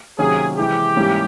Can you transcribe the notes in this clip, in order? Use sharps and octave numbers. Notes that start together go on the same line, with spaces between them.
C3 D#3 F#3 A#3 C#4 G#4
C3 E3 G#3 G4
G#2 E3 G3 A#3 C#4